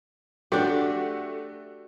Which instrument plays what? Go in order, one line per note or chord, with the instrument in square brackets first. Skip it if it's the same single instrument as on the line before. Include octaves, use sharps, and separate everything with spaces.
[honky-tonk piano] A3 F#4 [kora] D4 G4